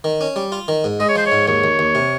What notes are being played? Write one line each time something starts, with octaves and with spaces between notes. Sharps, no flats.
D#3
C#4
G3
F4
D#3
G#2
G#3 D#5
C#5
F3 C5
C#5
G#2
D#2 C#5
D#2
D#2
C3